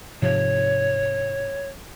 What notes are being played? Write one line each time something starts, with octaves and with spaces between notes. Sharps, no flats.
G#2 C3 F3 C#5